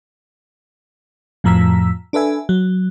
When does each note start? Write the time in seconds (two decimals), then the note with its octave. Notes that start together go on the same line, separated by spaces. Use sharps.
1.44 F2 A2 F3 A#5 E6 B6
2.13 D4 A4 B4 E5 G#5
2.49 F#3